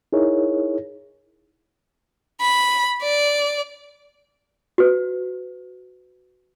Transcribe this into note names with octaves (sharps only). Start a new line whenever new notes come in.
D#4 E4 G#4 A#4 C#5
B5
D5
F#4 B4